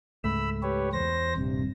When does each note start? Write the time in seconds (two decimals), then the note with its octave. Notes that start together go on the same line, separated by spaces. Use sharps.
0.24 C#2 G#2 A3 B5 E6
0.63 G4 B4 C#5
0.93 E2 C5 A#6
1.36 D#1 G2 C3